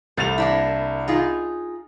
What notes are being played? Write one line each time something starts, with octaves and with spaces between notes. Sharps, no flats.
C2 A3 A6 F7
A#3 D4 E4
D#4 F4 G#4